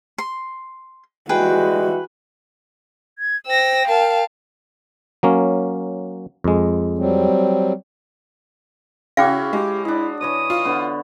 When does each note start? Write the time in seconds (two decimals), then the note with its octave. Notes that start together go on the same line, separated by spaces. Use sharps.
0.18 C6
1.29 E3 G3 G#3 F#4 G#4 B4 G5
3.19 G#6
3.47 C5 G5 E6 A#6
3.88 A#4 F5 A5
5.23 F#3 A#3 C#4
6.44 F2 G#3
6.98 F#3 G3 C4
9.17 C#3 C#4 E4 F#4 F5 G5 D6
9.53 G#3 G4
9.85 D4 E4 D#5
10.21 E3 C#5 D#5 D#6
10.50 F4
10.65 D3 B3